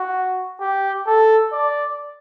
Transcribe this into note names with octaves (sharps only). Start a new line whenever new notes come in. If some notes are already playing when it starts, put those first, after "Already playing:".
Already playing: F#4
G4
A4
D5